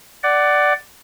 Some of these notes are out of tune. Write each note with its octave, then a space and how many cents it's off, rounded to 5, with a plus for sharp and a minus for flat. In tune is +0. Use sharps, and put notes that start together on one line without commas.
D5 +0 F#5 +20